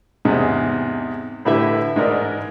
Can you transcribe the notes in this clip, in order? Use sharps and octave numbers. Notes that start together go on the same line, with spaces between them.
E2 G#2 C3
A2 D3 E4 G4 B4 E5
G#2 G#3 A#4 D5